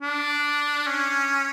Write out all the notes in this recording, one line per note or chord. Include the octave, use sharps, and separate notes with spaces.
D4
C#4